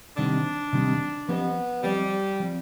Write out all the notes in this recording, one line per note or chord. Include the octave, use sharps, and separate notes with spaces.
C3 D#3 G3 C4 D4 D#4
C3 D#3 G3 C4 D#4
F3 B3 C4 G4 C5 D#5
F3 G3 C4 G4 C5 D#5
F3 C4